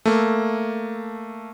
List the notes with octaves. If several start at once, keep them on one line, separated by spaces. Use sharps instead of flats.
A3 A#3